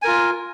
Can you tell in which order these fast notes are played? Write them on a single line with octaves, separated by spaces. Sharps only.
G#5 A#4 F4